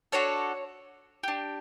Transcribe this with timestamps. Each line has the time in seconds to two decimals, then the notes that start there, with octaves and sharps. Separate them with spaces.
0.12 D4 F#4 A4 C#5
1.23 D4 G4